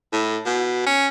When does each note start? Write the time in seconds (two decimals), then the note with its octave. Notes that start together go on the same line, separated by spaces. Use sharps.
0.12 A2
0.46 B2
0.87 C#4